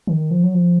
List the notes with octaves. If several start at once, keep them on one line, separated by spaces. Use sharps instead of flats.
D#3
F3
F#3
F3